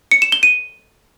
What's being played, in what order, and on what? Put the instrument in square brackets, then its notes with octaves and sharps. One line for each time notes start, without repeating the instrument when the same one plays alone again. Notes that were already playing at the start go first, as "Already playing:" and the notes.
[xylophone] C#7
E7
G7
D#7